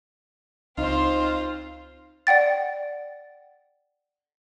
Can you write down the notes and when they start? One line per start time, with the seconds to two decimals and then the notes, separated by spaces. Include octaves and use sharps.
0.78 C#2 C4 D#4 F4 C5
2.27 D5 F#5 G5 A6